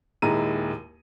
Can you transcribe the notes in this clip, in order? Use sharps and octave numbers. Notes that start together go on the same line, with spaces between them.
D#1 D#2 G#3 E4 A#5 D#7